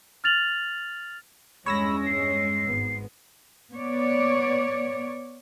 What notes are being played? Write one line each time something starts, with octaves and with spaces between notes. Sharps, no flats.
F6 A6 F7 F#7
E2 G2 G#3 C#4 C#5 B5 E6 A#6
C7
G#1 B3
B3 C#5 D5